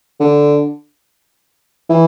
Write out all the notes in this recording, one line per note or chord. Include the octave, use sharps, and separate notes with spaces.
D3
E3